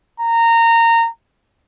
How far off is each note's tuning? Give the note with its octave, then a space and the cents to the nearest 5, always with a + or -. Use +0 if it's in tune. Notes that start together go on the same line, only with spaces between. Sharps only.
A#5 -20